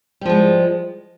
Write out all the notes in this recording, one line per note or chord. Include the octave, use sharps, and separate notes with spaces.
F3 G3 G#3